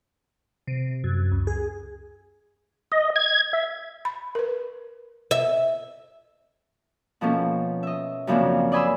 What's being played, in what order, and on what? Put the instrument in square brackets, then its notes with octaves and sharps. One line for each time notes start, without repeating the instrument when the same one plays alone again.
[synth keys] C3
F#2
C#2
G#4
[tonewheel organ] D#5
G#6
E5
[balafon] B5
A#4 B4
[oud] E5
[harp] B2 F3 A#3 C#4 A4
D#5 E5
F#2 C#3 F3 A#3 C4 D4
D5 D#5 G#5 B5 C6 E6